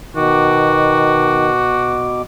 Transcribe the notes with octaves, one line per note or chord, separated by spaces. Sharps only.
B2 D#3 F#4 D6